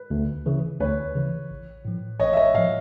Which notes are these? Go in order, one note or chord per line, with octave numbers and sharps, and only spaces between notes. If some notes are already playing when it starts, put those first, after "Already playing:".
Already playing: B4
D2
C#3 E3
D2 B4 C#5
C#3 E3
A1
A2 F3
A1 C#5 D#5
E5
C#5 D#5
A2 F3 D#5 F5